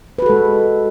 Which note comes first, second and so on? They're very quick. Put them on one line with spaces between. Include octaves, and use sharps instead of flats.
B4 F#4 A4 G#3